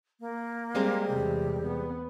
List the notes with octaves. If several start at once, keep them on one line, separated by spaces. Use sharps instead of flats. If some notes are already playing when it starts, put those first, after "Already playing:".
A#3
G3 G#3 C4
E2 C3 G4
B3